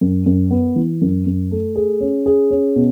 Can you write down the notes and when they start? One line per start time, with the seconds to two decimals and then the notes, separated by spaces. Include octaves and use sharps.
0.01 F#2
0.26 F#2
0.51 B3
0.76 E3
1.02 F#2
1.27 F#2
1.51 A3
1.76 G#4
2.01 C#4
2.26 G#4
2.51 C#4
2.76 B2